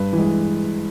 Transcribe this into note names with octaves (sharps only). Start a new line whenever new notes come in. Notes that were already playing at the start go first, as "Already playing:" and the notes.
Already playing: G2 B4
E3
G#3